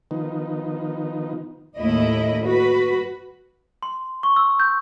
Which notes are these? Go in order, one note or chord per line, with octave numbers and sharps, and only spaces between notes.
D#3 F3 B3 D#4
D#2 A2 E4 D#5
F#4 B4
C6
C#6
E6
G6